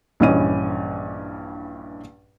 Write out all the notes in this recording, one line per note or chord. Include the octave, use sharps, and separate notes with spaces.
A#1 G2 E3 C#4 D#5 D#7